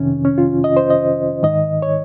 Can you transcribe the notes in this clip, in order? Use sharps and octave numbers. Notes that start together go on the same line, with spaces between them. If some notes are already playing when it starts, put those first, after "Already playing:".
Already playing: F2 C3 D#3 C#4
C#4
F4
D#5
C5
D#5
G#2 D#3 D#5
C#5